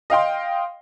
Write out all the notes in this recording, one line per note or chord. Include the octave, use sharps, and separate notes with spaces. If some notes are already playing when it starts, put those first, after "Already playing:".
D#5 F5 G5 C6